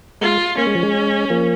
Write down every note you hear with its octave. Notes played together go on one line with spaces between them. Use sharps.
G#3 F4
A#3 C#4
G#3
F3
G#3
F3 A#3